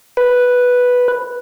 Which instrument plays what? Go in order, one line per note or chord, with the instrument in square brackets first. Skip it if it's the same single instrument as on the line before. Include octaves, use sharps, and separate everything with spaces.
[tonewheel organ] B4